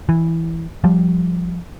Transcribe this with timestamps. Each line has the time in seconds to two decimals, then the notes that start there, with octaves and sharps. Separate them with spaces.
0.09 E3
0.84 F3 G3